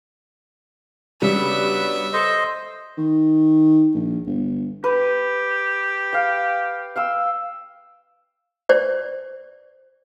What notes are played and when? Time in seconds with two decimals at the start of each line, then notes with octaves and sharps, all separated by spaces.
1.22 C#3 F#3 G3 B3 D4 E5
2.13 A4 C5 D#5
2.98 D#3
3.94 A#1
4.26 G1
4.84 G4 B4
6.13 F5 G5
6.96 F5 G5 E6
8.69 C5 D5